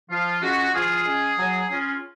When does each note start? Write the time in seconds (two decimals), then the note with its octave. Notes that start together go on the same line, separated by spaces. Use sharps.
0.10 F3 F4
0.42 G#3 C#4 F4 F#4
0.74 F3 F4 G#4
1.05 G#3 C#4 F4
1.38 F#3
1.70 C#4 F4